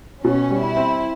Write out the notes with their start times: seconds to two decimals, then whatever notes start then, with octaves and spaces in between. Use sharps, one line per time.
0.24 B2 C#4
0.51 G3
0.64 E4
0.77 C4